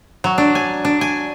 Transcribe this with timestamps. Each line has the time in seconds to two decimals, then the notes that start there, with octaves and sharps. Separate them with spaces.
0.24 F#3
0.38 D4
0.55 G#5
0.85 D4
1.01 G#5